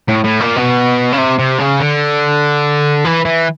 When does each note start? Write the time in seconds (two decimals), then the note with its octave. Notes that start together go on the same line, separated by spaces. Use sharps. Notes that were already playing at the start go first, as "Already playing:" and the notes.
0.08 A2
0.24 A2
0.40 A#2
0.56 B2
1.13 C#3
1.18 C3
1.39 C3
1.59 C#3
1.80 D3
3.05 E3
3.25 E3